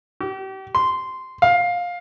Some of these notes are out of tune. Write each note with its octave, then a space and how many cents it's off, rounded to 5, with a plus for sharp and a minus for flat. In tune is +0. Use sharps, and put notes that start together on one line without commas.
G4 -35
C6 -10
F5 +15